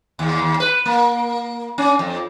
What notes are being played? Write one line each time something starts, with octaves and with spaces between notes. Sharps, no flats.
D#2
B4
A#3
C#4
F2